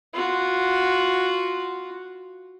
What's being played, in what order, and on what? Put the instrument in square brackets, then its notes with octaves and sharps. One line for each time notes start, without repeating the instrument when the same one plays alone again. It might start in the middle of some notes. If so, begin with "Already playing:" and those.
[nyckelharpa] F4 F#4